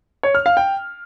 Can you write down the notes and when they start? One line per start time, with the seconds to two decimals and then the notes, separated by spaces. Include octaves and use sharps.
0.23 C#5
0.35 F6
0.46 F5
0.57 G5